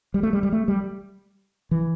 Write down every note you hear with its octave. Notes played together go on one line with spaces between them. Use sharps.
G3
A3
G3
G3
A3
G3
E3